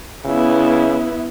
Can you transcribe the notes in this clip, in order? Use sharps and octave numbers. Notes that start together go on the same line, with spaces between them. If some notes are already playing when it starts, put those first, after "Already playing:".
C#3 B3 E4